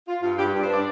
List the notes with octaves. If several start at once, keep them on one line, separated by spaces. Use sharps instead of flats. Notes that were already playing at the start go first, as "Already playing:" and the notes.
F4
G2 F4
G2 G4
G2
C5
D4 D5